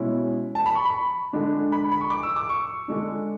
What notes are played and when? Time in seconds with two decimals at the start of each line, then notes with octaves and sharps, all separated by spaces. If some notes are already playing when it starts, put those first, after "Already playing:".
Already playing: B2 G#3 C#4 E4
0.55 A5
0.66 B5
0.75 C#6
0.85 B5
1.33 D3 G#3 D4
1.72 B5
1.92 B5
2.01 C#6
2.10 D6
2.23 E6
2.36 D6
2.49 C#6
2.88 D3 G#3 D4